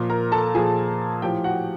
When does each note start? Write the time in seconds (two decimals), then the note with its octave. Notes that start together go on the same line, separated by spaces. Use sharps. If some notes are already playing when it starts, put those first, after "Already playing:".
Already playing: A#2 F3
0.10 A#4 A#5
0.32 A4 A5
0.54 A#2 F3 G#4 G#5
1.22 A2 F3 G4 G5
1.44 F#4 F#5